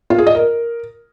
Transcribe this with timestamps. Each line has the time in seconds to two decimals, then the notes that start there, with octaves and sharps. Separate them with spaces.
0.10 F4
0.18 G#4
0.27 D#5
0.35 A#4